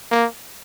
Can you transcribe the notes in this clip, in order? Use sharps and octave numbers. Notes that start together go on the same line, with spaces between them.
A#3